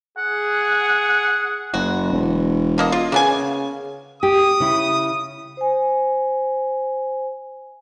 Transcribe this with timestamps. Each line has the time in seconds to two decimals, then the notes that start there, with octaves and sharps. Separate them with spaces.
0.18 G#4 F#5
1.74 F#1 F#4
2.13 E1
2.78 D3 A#3 D#5
2.92 F4
3.12 C#3 A#3 B3 G#5
4.23 G4 D#6
4.60 C#3 E4
5.57 C5 G#5